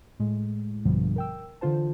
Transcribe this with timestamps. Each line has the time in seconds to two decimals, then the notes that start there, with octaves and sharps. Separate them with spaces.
0.20 A2 G#3
0.85 A#1 G2 B2 D3 F3 G3
1.16 A#4 G5 E6
1.61 D3 E3 F4 C5 A5